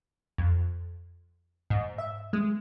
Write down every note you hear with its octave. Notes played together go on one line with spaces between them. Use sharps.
F2
G#2
E5
G#3